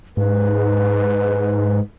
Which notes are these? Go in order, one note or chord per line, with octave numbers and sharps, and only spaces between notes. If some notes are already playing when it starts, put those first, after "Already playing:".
G#2 B4